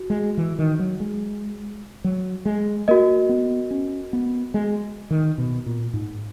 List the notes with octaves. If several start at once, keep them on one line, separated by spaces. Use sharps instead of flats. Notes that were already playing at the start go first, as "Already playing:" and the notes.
Already playing: F#4
G#3
E3
D#3
F#3
G#3
F#3
G#3
A#3 F#4 A#4 D#5
B3
C#4
B3
G#3
D#3
B2
A#2
G#2